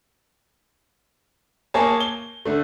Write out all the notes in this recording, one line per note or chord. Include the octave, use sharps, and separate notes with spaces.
A#3 G#4 C#5 G#5 A5
G7
D3 A3